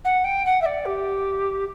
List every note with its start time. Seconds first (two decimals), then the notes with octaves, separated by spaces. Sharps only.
0.04 F#5
0.24 G5
0.45 F#5
0.61 E5
0.65 D5
0.85 G4